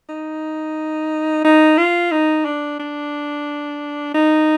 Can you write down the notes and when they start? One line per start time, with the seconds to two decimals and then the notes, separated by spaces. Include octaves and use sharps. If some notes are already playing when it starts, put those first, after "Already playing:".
0.09 D#4
1.44 D#4
1.77 F4
2.11 D#4
2.45 D4
2.79 D4
4.14 D#4